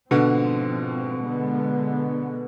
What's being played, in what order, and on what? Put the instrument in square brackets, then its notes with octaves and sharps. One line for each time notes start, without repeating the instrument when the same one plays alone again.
[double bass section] G#2 F3 C4 [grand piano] B2 D3
[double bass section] D3 G#3 B3